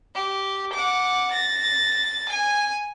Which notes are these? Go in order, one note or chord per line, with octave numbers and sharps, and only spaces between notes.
G4
F#5 D6
A6 A#6
G#5